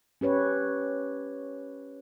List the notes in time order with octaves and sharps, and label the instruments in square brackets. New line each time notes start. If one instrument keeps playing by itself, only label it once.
[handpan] C#4 G4 B4 C#5